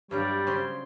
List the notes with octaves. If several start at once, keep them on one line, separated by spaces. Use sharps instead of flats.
G2 F#3 G3 D4 G4 C#5 F5
C#3 C5 C#5 C6